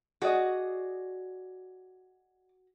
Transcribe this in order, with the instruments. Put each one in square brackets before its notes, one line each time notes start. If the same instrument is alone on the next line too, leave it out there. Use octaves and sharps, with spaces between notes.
[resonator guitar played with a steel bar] F#4 G#4 [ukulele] D5 D#5